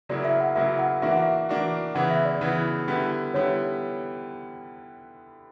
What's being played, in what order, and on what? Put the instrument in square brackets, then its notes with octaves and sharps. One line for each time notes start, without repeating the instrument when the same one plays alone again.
[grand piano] C#3 F#3 A#3 E4 [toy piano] D5
[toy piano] E5
F#5
[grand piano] C#3 F#3 A#3 E4 [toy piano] E5
[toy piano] F#5
[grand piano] E3 A#3 D4 F#4 [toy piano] E5
[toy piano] F#5
E5
[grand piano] E3 A#3 D4 F#4
[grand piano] C#3 E3 B3 E4 [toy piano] F#5
[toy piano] E5
D5
[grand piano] C#3 E3 B3 E4
D3 G3 B3 E4
[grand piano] D3 G3 B3 E4 [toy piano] C#5